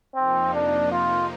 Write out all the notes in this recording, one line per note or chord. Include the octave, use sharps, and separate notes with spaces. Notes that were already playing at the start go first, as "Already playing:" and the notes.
F2 C3 F3 A#3 C4 D#4
D4
F4